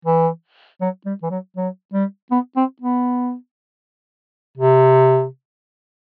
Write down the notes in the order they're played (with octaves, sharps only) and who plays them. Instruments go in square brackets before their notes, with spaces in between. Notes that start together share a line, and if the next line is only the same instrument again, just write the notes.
[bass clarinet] E3
F#3
G3
E3
F#3
F#3
G3
B3
C4
B3
C3